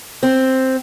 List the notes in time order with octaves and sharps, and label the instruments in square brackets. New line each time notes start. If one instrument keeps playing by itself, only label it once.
[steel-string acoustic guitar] C4